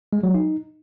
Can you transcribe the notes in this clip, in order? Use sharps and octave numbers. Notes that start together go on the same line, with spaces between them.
G#3
F#3
D#4